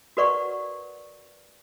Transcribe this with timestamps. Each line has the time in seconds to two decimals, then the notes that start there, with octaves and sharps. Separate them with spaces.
0.17 F#4 A#4 B4 D5 F#5 C#6